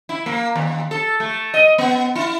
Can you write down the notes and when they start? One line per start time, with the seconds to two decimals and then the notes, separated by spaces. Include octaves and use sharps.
0.09 E4
0.26 A#3
0.56 D#2
0.91 A4
1.20 A3
1.54 D#5
1.78 B3
2.15 E4